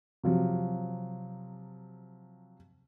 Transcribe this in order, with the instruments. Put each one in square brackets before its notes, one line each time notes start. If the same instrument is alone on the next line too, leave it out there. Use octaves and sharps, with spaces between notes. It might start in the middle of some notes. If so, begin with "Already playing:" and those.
[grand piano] C3 F3 F#3